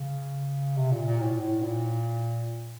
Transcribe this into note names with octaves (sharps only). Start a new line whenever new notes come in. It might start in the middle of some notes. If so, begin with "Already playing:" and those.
Already playing: C#3
C3
A#2
A#2
A2
A2
A#2